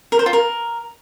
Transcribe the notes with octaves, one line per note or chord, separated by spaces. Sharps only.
A#4
C5
F4
A#4